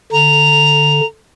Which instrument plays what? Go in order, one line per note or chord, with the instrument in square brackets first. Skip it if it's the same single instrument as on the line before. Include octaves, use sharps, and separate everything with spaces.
[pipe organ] D3 [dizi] A#5